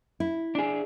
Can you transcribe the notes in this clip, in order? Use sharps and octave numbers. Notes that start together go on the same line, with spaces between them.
E4
D4 G#4